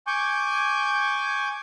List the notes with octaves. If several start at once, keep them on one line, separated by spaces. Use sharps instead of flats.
G#5 C#6 D6 G6